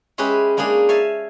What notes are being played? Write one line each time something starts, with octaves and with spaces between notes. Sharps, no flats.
G#3 C#4 G4 G#4 B4 E5
G#3 A#3 D4 D#4 G#4
C#5 E5 F5 G#5 A5